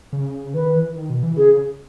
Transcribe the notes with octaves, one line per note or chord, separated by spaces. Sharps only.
C#3
D#3 B4
E3
D#3
B2
E3
C#3 G#4